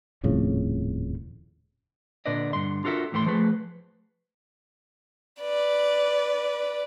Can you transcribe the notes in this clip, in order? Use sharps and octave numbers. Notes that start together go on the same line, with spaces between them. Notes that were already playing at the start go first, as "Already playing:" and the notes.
D#1 F2 A2 C#3
A#2 D3 B4 D5 D#5
G2 D3 C6
D4 F4 F#4 A4 A#4 E5
D#2 A2 E3 A3 C6
F3 A3 G#4 B4
B4 D5